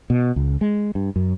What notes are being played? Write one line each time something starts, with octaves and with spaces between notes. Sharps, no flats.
B2
C#2
G#3
G2
F#2